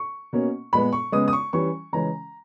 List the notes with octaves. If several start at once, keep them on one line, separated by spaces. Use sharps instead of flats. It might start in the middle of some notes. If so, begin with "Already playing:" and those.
Already playing: C#6
B2 A#3 C#4
A#2 G#3 B3 B5
C#6
C#3 G#3 B3 D#6
D#6
C#6
E3 G3 C#4 C#6
C#3 E3 G#3 C#4 A#5